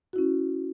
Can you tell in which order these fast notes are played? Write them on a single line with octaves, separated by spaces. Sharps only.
F#4 E4 C#4